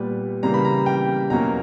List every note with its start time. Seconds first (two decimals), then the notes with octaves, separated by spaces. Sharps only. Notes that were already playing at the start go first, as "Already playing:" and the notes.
Already playing: A#2 G3 B3 B4
0.43 C#3 E3 G3 A#3 A#5
0.54 B5
0.65 A#5
0.86 G5
1.30 E2 B2 F#3 A#3 C#4 A#5